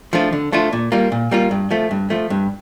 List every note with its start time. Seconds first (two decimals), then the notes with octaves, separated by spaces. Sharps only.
0.13 F3 A3 D4 F4
0.33 D3
0.52 F3 A3 D4 F4
0.73 A#2
0.92 G3 A#3 F4
1.12 A#2
1.31 G3 A#3 F4
1.51 G2
1.71 F3 A3
1.91 G2
2.10 F3 A3
2.30 G2